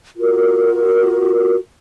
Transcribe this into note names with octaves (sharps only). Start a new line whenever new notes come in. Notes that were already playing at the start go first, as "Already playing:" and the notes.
F4 F#4 A#4